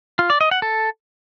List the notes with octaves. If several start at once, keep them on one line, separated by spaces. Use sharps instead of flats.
F4
D5
D#5
F#5
A4